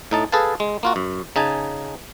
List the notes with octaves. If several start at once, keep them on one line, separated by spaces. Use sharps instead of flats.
A2 D#4 A5
G#4 A4 B4 F5 A5
G#3
A#3 F4 F#4
F#2
C#3 D#4 G#5 A5